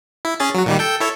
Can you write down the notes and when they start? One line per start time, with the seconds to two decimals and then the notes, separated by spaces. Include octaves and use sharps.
0.25 E4
0.40 C#4 G#4 A6
0.54 F#3 F#4
0.66 A#2 D#3 G3
0.79 A4 G5
1.00 E4 A4 C#5